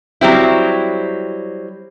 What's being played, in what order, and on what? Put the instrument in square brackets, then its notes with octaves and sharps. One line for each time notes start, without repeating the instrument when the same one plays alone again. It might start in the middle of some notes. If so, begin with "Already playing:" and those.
[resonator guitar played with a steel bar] F#3 G3 C4 E4